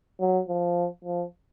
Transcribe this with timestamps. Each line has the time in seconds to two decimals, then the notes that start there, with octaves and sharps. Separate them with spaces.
0.20 F#3
0.48 F3
1.04 F3